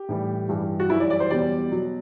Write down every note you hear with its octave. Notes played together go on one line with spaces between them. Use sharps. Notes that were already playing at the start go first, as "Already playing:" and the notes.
Already playing: G4
A2 E3 G3
G2 E3 G3
F#4
F#2 E3 G3 E4
D5
D5
C5
E2 B2 G3 D5
B2 F#3